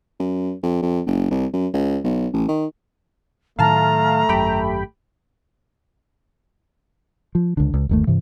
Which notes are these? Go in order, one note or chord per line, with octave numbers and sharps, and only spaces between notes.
F#2
F2
F2
F#1
C2
F#2
C#2
B1
A1
D#3
A2 D#3 F#3 A3 F5 A5 A#5 F6
G#1 F#2 G4 G5 B5
F3
C#2 D3
C#2
G1 D#2 A3
G2 C3 E3